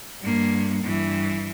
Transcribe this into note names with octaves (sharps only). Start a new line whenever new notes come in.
G2 A#3
G2 E3